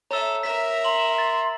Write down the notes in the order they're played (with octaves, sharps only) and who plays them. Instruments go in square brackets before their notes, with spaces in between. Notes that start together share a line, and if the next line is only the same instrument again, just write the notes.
[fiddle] A4 E5 [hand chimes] C#5 [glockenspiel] A#5 E6
[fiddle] A#4 E5 [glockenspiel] B6
[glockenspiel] A#5 F#7 [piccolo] C6
[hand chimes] A6